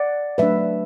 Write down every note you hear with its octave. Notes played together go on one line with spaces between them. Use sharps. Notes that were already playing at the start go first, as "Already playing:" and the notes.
Already playing: D5 F#5
F#3 A3 D4 B4 E5